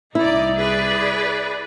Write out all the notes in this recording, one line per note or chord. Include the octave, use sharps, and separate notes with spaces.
C2 D#4 E4 D5
G#4 B4 D5